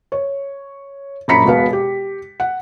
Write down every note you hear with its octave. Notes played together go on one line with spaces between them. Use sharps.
C#5
A#1 F#2 A#5 B5 B6 C#7
E1 B2 B3 F5
G4
F#5